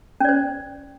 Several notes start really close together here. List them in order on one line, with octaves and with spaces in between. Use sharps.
C#4 D5 C5